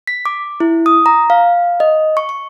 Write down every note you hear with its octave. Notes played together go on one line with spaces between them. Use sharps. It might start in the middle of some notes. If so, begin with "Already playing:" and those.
B6
D6
E4
D#6
A#5
F5
D#5
C#6
C#6